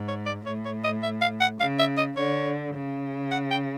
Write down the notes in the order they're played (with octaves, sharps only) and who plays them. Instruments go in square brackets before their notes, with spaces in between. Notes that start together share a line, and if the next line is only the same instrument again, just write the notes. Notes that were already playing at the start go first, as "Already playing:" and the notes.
Already playing: [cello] G#2
[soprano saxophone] C#5
D5
[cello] A2 [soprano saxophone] C#5
[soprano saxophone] C#5
D#5
E5
F5
F#5
[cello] C#3 [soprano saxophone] F5
[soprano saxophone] E5
D#5
[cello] D3 [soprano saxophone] C#5
[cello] C#3
[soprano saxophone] F#5
G5